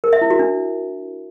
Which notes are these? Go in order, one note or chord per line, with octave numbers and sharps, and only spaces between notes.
A#4
E5
E4
F#4
D4